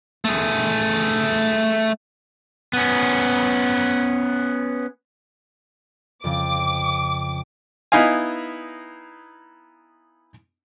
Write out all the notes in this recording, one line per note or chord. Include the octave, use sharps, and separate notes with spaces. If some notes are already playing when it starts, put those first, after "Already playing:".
A3 G#4
B3 C#4
F2 C#3 D6
B3 D#4 E4 D#5 F5 G#5